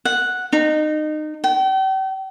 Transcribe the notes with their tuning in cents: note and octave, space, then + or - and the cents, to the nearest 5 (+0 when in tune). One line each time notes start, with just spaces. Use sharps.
F#5 -5
D#4 -25
G5 -40